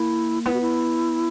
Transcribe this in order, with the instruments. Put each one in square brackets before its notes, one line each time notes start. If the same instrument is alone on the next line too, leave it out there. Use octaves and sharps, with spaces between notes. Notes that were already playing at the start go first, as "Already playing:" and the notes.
Already playing: [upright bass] A#3 [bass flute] E4
[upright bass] B3 [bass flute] E4
[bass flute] F#4
E4